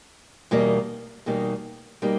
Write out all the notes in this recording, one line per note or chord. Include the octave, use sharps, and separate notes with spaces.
E2 B2 G3 A#3 D#4
E2 B2 G3 A#3 D#4
B2 G3 A#3 D#4